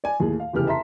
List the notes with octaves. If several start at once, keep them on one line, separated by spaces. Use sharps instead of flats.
D5 G#5
D#2 A2 G#4
F5
F1 E2 C#3 G4 F6
E5 A5 A#5 C6 B6